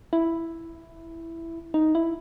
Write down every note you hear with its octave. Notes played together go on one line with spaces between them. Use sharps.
E4
D#4
E4